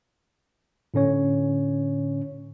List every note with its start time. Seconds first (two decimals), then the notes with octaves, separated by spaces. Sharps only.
0.94 A2 D3 C#4 C#5